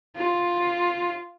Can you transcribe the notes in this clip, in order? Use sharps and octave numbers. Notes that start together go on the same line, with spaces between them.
F4